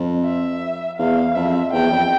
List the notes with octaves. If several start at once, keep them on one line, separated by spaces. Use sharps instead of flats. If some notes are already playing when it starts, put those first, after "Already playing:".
Already playing: F2
E5
E2 F5
F2 E5
E2 G5
F2